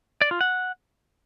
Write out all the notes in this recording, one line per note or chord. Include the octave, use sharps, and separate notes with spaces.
D5
F4
F#5